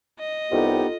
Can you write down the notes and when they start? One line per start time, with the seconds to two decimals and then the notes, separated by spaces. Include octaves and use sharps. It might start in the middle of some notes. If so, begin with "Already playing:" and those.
0.19 D#5
0.52 C2 B3 D#4 F4 G4 A4